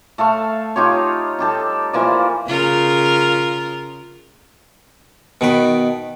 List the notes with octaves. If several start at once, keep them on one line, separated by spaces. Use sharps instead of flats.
A3 A4 F5 C#6
D#4 F4 G4 C#5
D#4 G4 A4
E3 F3 A#3 D5
C#3 F4 A#4
B2 D#3 B4